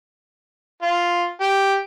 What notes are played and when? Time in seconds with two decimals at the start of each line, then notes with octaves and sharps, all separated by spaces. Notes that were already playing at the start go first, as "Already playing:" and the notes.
0.82 F4
1.41 G4